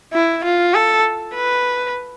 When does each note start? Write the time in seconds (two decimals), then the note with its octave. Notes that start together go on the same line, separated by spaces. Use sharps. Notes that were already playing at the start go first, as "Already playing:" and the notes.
0.13 E4
0.44 F4
0.74 A4
1.35 B4